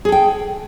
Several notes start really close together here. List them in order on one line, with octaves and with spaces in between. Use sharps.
G#4 A4 G5